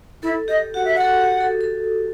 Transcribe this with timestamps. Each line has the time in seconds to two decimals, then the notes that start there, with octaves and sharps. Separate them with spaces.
0.23 E4 A4
0.48 G4 D#5
0.74 F#4 F#5
0.85 E5
0.95 F#5
1.01 A4
1.21 G4
1.40 A4
1.61 A4